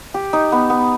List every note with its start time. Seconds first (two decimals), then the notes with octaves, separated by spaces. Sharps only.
0.14 G4
0.33 D#4
0.52 B3
0.70 B3